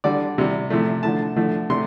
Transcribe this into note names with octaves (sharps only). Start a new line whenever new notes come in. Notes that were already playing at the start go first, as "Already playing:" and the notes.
D3 G3 D5
C3 G3
C3 F3 A3
D3 F3 A3 A5
D3 F3 A3
C3 A3 C6